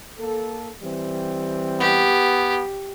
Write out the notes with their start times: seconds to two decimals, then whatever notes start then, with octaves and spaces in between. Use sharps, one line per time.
0.18 A#3 A4
0.83 E3 G3 C4
1.80 B3 G4